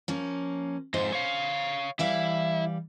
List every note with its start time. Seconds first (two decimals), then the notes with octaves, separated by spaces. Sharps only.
0.08 F3 A#3 C#4
0.94 F2 G#2 G#3 C5
1.12 C#5 F5
1.99 E3 G3 E4 F5